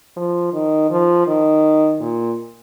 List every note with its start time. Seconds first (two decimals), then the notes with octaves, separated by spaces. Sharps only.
0.17 F3
0.53 D#3
0.90 F3
1.27 D#3
2.00 A#2